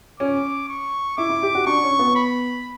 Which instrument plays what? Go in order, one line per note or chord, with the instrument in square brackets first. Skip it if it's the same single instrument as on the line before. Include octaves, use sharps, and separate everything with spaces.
[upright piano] C#4 [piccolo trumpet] D6
[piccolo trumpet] C#6
[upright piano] E4 [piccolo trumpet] D6
[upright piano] E4
G4
F#4
[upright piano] D4 [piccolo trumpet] C#6
[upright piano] C#4
B3
[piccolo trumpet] B5